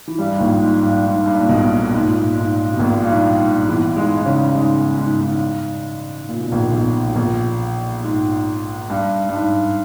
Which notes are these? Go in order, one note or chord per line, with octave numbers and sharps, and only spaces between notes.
E3
G2 G3
G#2
A#1 A#2
G#2
G2
G#2
G2
G#2
A#2
B1 B2
G#2
A#2
G#2
G#2
B2
A#1 A#2
G2
G#2
G#2
E2 E3
G#2 G#3
D#4
C#3 C#4
G#2 G#3
G#2
G#2
A#2
B2
A#1 A#2
B1 B2
B2
A#1 A#2
G#2
G2
G2
G#2